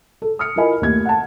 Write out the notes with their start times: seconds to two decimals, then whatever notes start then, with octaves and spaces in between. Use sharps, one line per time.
0.22 A4
0.39 D#6 F6 C#7
0.56 E4 F4 A#4 D#5 G#5 B5
0.81 D#2 A3 G#6
1.06 F#5 A5